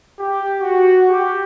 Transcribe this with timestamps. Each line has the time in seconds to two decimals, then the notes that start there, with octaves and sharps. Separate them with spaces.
0.19 G4
0.61 F#4
1.09 G4